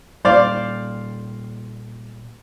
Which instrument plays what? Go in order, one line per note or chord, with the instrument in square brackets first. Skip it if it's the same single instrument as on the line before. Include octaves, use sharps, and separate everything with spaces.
[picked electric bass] A#2 G3 [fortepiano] C5 D5 F5